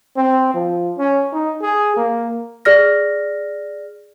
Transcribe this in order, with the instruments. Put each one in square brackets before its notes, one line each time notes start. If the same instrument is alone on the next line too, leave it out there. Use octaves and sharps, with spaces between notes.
[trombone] C4
F3
C#4
D#4
G#4
A#3
[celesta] G#4 D5 F6 A#6